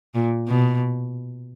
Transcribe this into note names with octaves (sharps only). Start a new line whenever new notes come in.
A#2
B2